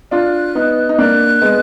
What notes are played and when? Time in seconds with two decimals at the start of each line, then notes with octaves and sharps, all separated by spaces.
0.11 D4 F4 F#6
0.55 B3 D#4
0.89 D#4
0.98 A#3 D4 F#6
1.42 G#3 B3